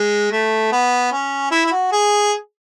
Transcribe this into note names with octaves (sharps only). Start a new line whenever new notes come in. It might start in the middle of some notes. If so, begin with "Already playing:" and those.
Already playing: G#3
A3
B3
C#4
E4
E4
F#4
G#4